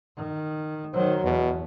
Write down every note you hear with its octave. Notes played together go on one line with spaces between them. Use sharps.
D#3
D#3 F#3 C5
E2 B2